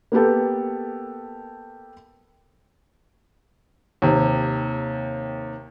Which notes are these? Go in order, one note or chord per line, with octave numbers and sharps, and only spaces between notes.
A#3 B3 G4 A4
D#2 C3